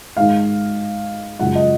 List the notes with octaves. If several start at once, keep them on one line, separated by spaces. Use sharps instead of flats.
G#2 D#3 G#3 F5
F#2 C#3 F3 G#3 F#5
D#5